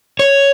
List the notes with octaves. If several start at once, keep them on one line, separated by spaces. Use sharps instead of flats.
C#5